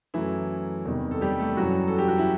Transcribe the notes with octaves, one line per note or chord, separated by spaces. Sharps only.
F#2 E3 F#3 A3 E4
E2 C3 D#3 G3
A4
G3 G4
A3 A4
F#2 E3 F#3 G3 F#4
A4
G4
F#4
E4